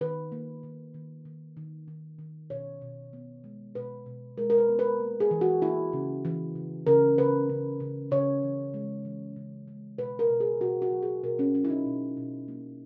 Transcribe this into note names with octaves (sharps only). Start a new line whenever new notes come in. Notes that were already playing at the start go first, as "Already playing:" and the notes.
D#3 B4
A#3
D#3
D#3
D#3
D#3
D#3
D#3
B2 C#5
B2
B3
G#3
B2 B4
B2
G#3 A#4
A#4
B4
B3
B4
A#3
G#4
E3
F#4
A#3 E4
C#3
E3
C#3
C#3 A#4
C#3 B4
C#3
C#3
C#3 C#5
E3
G#3
E3
C#3
G#3
B2 B4
A#4
B2
G#4
B2 F#4
F#4
F#3
G#4
B2 A#4
C#4
F#3 C#4
E4
D#4
B2
B2
A#3